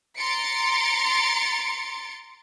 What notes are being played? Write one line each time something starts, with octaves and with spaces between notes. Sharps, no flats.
A#5 C6 A6 C#7 D7